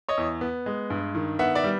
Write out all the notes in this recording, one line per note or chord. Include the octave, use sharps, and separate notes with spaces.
C#5 D#5
E2
B3
G#3
G2
D#3
B3 E5 F#5
D5 E5
G3